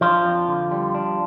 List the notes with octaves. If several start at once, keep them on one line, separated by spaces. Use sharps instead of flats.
F3 D4 F4
F2
D3
G3
D4